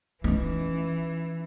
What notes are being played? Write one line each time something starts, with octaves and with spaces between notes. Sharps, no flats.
E3 C#4 D#4